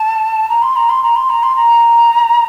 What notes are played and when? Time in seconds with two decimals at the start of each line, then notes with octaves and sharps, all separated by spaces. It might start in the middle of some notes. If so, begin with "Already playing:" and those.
Already playing: A5
0.49 A#5
0.62 C6
0.76 A#5
0.89 C6
1.02 A#5
1.15 C6
1.29 A#5
1.43 C6
1.55 A#5